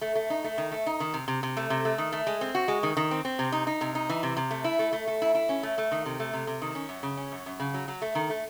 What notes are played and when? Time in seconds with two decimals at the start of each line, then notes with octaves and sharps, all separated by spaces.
0.01 A3
0.15 A3
0.30 D#4
0.44 A3
0.58 D#3
0.72 A3
0.87 D#4
1.00 D#3
1.14 C3
1.28 C3
1.43 C3
1.57 A3
1.70 C3
1.85 A3
1.98 D#3
2.12 A3
2.27 G#3
2.41 C4
2.55 F#4
2.68 G#3
2.83 D#3
2.97 D#3
3.11 C4
3.25 C4
3.39 C3
3.52 D#4
3.67 D#4
3.81 C3
3.95 D#4
4.09 E3
4.23 C3
4.37 C3
4.51 A3
4.64 E4
4.79 A3
4.92 A3
5.07 A3
5.22 E4
5.35 E4
5.49 C#4
5.63 A3
5.78 A3
5.92 D#3
6.06 C3
6.20 A3
6.34 C3
6.47 C3
6.62 D#3
6.75 C#4
6.89 F#2
7.03 C#3
7.17 C#4
7.32 F#2
7.46 F#2
7.60 C#3
7.74 F#3
7.88 F#3
8.02 A3
8.15 D#3
8.30 A3